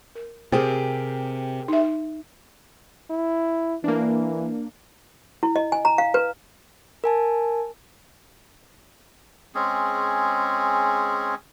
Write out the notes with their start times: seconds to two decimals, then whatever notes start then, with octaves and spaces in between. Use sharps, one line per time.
0.15 A#4
0.52 C3 G4 G#4 A#4 C5
1.68 D#4 E5
3.10 E4
3.84 E3 A#3 D4
5.43 E4
5.56 D#5
5.72 G#5
5.85 A#5
5.98 F5
6.14 B4
7.04 A#4 G#5 A5
9.55 G#3 C4 C#4 G#4